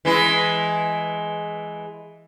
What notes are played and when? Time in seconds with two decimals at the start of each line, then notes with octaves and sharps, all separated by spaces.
0.05 E3 G#3 E4